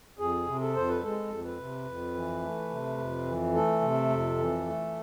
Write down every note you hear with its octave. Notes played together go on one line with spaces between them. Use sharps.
F2 G#4
C3
A4
F2 C5
B4
G#3 A4
F2
B4
C3
F2
E3
A3
C3
F2
E3
A3 A4
C3
F2
E3
A3